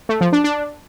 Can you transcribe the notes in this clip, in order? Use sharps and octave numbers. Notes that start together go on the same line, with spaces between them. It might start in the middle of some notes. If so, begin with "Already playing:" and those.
A3
F3
D4
D4